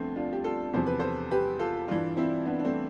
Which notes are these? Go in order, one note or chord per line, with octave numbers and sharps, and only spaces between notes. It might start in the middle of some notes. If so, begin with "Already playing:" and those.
Already playing: D2 D3 F3 A3 B3 C4
D4 F4
G4
F4 A4
E2 C3 F3 C5
B4
A4 C5
G4 B4
F4 A4
G2 E3 D4 F4
C4 E4
B3 D4
D4
A3 C4